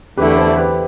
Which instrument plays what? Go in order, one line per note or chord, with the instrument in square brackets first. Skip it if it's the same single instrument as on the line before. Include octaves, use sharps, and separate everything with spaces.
[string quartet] E2 D3 A3 E4 [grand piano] G4 B4
[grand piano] A4 C5
G4 B4